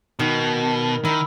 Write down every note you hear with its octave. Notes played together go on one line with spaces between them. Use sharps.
B2 D#3
D#3 E4